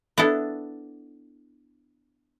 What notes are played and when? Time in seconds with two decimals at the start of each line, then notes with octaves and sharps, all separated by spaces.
0.18 B3 D4 E4 A4